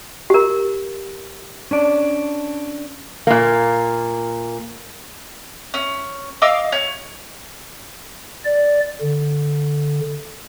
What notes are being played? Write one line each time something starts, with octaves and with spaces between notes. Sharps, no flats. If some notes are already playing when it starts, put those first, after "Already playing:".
G4 A#4
C#4 D4 D5
A#2 A#3
C#4
D#5 F5 D6 E6
C#5
D5
D3